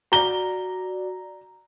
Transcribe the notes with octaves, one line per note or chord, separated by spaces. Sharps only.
F#4 D5 A#5 G7